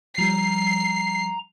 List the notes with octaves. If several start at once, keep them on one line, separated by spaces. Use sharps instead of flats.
F3 G3 A#5 C7